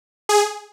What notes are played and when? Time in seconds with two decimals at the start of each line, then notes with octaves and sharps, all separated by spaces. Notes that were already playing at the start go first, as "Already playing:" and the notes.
0.29 G#4